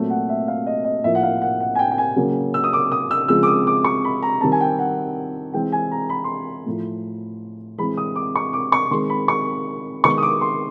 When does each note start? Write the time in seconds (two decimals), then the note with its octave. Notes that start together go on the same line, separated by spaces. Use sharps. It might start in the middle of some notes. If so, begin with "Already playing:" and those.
Already playing: A#2 F#3 A3 C4
0.10 F#5
0.29 E5
0.48 F5
0.67 D#5
0.85 D#5
1.04 A2 F3 A#3 E5
1.15 F#5
1.23 F5
1.42 F#5
1.60 F#5
1.75 G#5
1.79 G5
1.91 G5
1.98 G#5
2.16 C#3 F#3 A#3
2.54 E6
2.64 D#6
2.73 D6
2.92 D#6
3.11 E6
3.28 C#3 F3 G#3 C4 E6
3.43 D6
3.47 D#6
3.67 D6
3.85 C#6
4.04 B5
4.23 A#5
4.41 D#3 G3 C4 A5
4.52 G#5
4.61 G5
4.79 F#5
5.53 E3 G#3 C4 G5
5.72 G#5
5.92 A#5
6.09 B5
6.24 C6
6.66 A2 F3 A3
7.78 E3 G#3 C4 B5
7.97 D#6
8.16 D6
8.36 C#6
8.53 D6
8.72 C#6
8.91 D#3 G#3 C4 C6
9.09 B5
9.28 C#6
10.04 D#3 G#3 B3 C#6
10.18 D#6
10.23 D6
10.41 C6